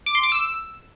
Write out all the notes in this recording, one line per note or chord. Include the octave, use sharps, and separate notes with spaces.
D6
C6
D6
E6